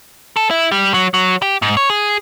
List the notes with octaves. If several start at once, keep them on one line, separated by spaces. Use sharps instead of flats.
A4
E4
G3
F#3
F#3
G4
G#2
C#5
G#4